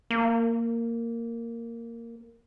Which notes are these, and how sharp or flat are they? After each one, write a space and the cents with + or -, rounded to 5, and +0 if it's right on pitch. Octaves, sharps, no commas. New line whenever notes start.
A#3 -10